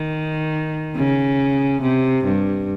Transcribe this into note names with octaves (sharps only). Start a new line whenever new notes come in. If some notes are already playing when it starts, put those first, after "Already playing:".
Already playing: D#3
C#3
C3
G2